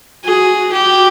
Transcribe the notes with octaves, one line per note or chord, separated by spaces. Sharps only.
F#4 G#4
F#4 G4